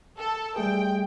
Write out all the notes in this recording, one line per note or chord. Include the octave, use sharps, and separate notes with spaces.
A4
G3 A3 G#4 G5